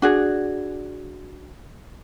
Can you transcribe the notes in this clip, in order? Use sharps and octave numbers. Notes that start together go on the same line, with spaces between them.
D4 F#4 G#4